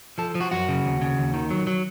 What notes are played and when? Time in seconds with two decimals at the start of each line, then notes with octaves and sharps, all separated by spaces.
0.18 F3 A4
0.35 F3
0.41 F#4
0.51 F#2 F#4
0.68 C#3
0.85 D#2
1.02 C#3
1.18 D#2
1.34 D#3
1.50 F#3
1.67 F#3